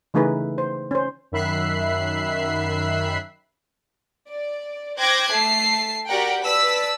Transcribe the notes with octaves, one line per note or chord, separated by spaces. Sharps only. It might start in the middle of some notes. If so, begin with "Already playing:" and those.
C#3 E3 A3 D#4 G#4 B4
C5
C#4 C5
F#2 D#3 E5 B5 F#6 C7
D5
C5 G5 D6 F#6 G#6 A#6
A3 A5 C7
F#4 G4 A#4 D5 F#5 G5
B4 D5 A5 E6 B6